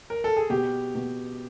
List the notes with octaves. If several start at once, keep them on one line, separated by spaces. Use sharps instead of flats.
A#4
A4
G#4
B2 G4
B2